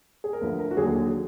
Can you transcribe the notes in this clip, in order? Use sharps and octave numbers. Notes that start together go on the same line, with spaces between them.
G#4
A#4
D2 D3 F3 B4
A#4
F#4
D#2 D3 F#3 G#4
G#4